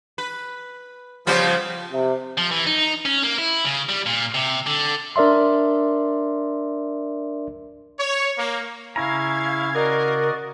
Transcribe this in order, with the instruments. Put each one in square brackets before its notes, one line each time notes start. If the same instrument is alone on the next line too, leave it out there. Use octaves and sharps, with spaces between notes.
[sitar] B4
[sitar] C#3 G3 B3 [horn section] F3
[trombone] C3
[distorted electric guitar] F3
E3
D#4
C#4
A#3
E4
C#3
G3
A#2
C3
D3
[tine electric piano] D4 A#4 D5 E5 C6
[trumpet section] C#5
A#3
[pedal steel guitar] C#3 A#5 [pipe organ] C#4 E4 [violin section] F5 G#6
[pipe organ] F#4 D5 D#5 [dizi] A#4